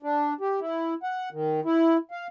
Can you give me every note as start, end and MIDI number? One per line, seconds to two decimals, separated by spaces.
0.02 0.34 62
0.41 0.60 67
0.60 0.94 64
1.03 1.29 78
1.33 1.60 51
1.65 1.97 64
2.11 2.27 77